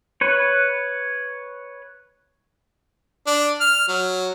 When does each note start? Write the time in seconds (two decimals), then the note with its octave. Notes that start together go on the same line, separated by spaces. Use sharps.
0.21 B4 C#5
3.27 D4
3.61 F6
3.88 F#3